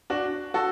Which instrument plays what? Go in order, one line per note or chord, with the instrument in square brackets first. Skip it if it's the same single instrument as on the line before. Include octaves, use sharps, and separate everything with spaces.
[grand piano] D4 F#4
F#4 A4